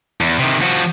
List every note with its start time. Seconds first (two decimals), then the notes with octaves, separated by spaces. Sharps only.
0.21 E2
0.39 C3 D#3
0.62 F3 F#4